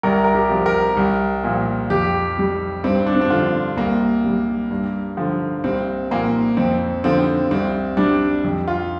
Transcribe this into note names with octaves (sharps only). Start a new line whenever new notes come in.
C2 A#4
A#4
G4
C3 F3
A#4
C2
A#2 F3
F2 G4
C3 G3
G2 C4
D4
C4
D4
D3 F3 F4
C2 A#3
C3 G3
G2
D3 F3
C2 C4
A#2 F3 A#3
F2 C4
D3 F3 C4
C2 C4
C3 G3 D4
F2
F4